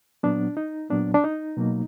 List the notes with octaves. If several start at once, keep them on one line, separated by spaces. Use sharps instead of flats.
A#2 F#3 B3 D4
D#4
A#2 F#3 B3 D4
D4
D#4
B2 F#3 A#3